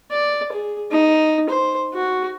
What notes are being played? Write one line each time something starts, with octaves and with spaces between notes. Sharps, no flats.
D5
G#4
D#4
C5
F#4